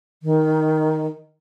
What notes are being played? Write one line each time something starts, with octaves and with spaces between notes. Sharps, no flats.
D#3